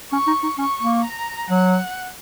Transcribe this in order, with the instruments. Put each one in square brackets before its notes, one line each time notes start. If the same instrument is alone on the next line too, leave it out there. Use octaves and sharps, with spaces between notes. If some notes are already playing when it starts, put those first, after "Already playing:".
[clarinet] C#4 [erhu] C#6
[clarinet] D#4
D#4
[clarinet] C#4 [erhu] C#6
[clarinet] A#3
[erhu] A#5
[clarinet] F#3 [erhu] F#5